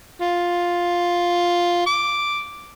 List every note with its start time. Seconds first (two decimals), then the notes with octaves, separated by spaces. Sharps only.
0.20 F4
1.87 D6